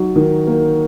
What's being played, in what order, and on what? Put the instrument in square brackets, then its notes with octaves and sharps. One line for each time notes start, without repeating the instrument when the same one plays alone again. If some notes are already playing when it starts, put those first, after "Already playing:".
Already playing: [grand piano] F#3 D#4
D#3
A#3